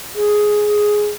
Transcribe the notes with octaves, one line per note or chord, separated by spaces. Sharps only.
G#4